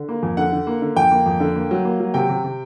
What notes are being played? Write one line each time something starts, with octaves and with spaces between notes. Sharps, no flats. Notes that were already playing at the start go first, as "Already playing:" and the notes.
Already playing: D3
A#3
F2
D3 F#5
D3
A#3
D3
F2 G5
A#3
F2
D3
A#3
F#3
A#3
F#3
C3 G5
C3
C3